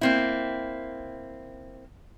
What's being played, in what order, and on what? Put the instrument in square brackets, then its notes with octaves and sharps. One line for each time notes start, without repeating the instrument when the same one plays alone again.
[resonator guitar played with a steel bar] A#3 C4 E4